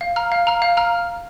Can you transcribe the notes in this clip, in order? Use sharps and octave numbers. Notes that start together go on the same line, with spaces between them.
F5
A#5 F6
F5
A#5 F6
F5
A#5 F6